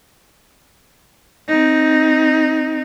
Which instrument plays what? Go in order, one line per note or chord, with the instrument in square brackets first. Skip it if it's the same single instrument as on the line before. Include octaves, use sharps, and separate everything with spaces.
[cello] C4 D#4